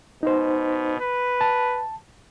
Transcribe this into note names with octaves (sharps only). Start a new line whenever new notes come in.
B2 D#4 C5
B4
A5